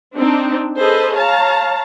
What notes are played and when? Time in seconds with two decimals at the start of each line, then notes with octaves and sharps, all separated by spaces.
0.16 C4 D4 D#4
0.78 G#4 A4 B4 C5 D#5
1.16 C#5 F5 A5 A#5